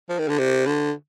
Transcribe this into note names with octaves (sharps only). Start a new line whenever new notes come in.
F3
D#3
D3
C3
D3